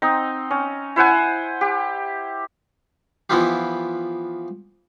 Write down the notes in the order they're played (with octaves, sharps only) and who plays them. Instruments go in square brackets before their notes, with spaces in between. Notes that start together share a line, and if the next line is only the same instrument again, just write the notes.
[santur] C4 D#4 D#5
C#4
E4 C5 F#5 G#5
G4
[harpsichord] E3 F3 B3 E4 F4 G4